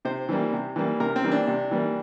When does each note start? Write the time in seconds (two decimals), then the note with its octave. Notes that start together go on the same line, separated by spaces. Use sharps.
0.05 C3 C5
0.29 E3 G3 A#3
0.53 C3
0.76 E3 G3 A#3
1.00 C3 A#4
1.16 C4
1.24 E3 G3 A#3
1.31 D4
1.47 C3
1.71 E3 G3 A#3